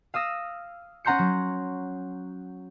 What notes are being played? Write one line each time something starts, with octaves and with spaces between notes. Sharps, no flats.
F5 D#6 E6 A#6
C#4 F#5 A#5 C6 G6 C#7
F#3